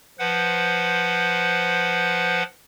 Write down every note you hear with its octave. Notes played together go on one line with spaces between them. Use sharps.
F3 B4 C5 F#5